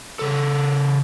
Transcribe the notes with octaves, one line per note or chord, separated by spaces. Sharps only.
C#3 A4